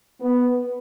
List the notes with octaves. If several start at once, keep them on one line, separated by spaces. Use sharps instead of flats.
B3